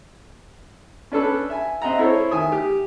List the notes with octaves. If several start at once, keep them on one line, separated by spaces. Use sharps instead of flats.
C#4 D4 A4 B4
E5 G#5
C4 D#5 E5 F#5 A#5
E4 A4 C5 C#5
D#3 E5 G#5 D#6
G4